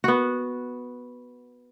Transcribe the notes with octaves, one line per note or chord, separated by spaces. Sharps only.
B3 F#4